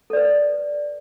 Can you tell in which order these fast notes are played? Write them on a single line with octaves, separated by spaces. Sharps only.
A4 D5 B4